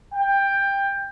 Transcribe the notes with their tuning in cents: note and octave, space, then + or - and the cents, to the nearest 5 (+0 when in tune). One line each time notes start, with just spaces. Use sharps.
G5 +15